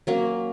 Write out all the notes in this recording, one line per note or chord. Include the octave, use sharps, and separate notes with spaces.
F#3 A#3 C#4